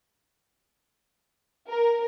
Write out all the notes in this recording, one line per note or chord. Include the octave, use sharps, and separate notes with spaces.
A#4